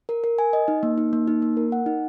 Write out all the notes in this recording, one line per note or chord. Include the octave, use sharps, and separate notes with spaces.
A#4
A#4
G#5
D#5
D#4
A#3
D#4
A#3
D#4
A#3
A#4
F#5
D#4